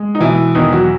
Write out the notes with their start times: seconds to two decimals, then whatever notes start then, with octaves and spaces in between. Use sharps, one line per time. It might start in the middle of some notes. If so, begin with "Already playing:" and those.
Already playing: G#3
0.15 D#4
0.20 B2 E3 E4
0.55 E2 D#3 D#4
0.72 F#3 F#4